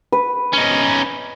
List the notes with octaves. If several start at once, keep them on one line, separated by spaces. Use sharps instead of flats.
B4
C#4 D#4